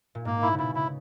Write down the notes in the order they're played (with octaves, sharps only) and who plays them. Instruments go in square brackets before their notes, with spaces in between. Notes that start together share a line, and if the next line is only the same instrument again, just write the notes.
[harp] A#2
[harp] G#2 [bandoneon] A#3
[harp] A#2 [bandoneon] E4
[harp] C#3
[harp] B2 [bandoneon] E4
[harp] C#3 [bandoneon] E4